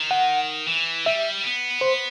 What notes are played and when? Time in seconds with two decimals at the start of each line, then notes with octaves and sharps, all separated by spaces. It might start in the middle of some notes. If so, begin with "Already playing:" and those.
Already playing: D#3
0.11 F#5
0.67 E3
1.05 G3 E5
1.44 B3
1.81 C5